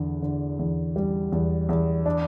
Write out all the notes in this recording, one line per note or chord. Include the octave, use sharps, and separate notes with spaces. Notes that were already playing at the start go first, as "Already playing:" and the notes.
Already playing: E2 D3
D3
E2
G3
E2
E2
D4